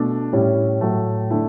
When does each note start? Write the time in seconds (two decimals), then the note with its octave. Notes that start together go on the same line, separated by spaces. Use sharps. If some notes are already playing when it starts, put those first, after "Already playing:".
Already playing: B2 A3 D4
0.33 A2 G3 C#4 E4
0.81 A2 F#3 A3
1.30 D3 A3 E4